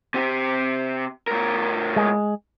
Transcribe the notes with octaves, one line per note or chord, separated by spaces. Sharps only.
C3 G4
A2 A#4
G#3